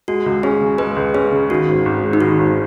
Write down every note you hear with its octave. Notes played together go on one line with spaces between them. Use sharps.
G#3 F#4
C#2
C#4 G#4
C#3
G#3 B4
C#2
C#4 G#4
C#3
D#3 F#4
G#1
G#1
G#2
D#4
D#3 F#4
G#1